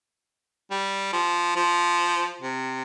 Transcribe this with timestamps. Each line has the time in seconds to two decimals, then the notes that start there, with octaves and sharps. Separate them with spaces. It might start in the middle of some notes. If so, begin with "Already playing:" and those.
0.71 G3
1.13 F3
1.56 F3
2.41 C3